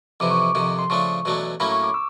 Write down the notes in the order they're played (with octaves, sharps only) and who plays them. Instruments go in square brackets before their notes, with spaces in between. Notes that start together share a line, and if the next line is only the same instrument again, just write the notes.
[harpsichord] F2 C3 E3 [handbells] D6
[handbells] C#6
D6
[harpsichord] F2 C3 D#3
[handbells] C6
[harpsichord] C#3 F3 A3 D4 [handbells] C#6
[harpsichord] E2 B2 F#3 A3 D4
[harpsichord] A2 F#3 A#3 C#4 E4 [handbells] B5
[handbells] C#6
D6
E6